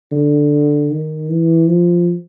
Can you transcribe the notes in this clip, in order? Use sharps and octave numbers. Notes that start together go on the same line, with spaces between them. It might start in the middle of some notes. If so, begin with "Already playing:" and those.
D3
D#3
E3
F3